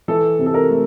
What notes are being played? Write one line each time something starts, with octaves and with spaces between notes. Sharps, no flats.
E3 A4
C3
A4
A#4
A3